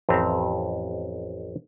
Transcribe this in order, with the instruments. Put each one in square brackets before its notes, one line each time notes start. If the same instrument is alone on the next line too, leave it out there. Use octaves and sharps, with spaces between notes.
[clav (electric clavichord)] A1 F2 C4 E5 A#5